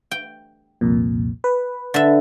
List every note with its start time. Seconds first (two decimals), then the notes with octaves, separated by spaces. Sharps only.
0.11 G5
0.81 C2 F2 A#2
1.44 B4
1.94 D3 E5